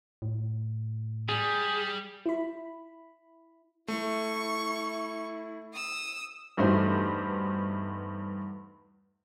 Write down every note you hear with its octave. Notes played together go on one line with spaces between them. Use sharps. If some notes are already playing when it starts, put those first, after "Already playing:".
A2
G3 G#4
E4 B5
A3 E4 C#6
D#6 E6
E2 G2 A3 D#4 F#4 C5